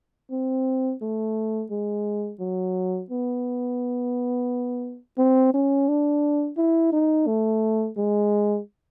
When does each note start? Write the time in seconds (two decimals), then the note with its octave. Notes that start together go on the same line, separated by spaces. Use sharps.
0.31 C4
1.02 A3
1.71 G#3
2.40 F#3
3.10 B3
5.18 C4
5.54 C#4
5.88 D4
6.57 E4
6.92 D#4
7.27 A3
7.97 G#3